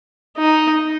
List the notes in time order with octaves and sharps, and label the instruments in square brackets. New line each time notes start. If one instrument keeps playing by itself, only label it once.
[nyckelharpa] D#4